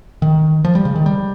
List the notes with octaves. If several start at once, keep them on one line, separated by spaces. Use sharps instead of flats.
D#3
F3
G3
C#3
D#3
G3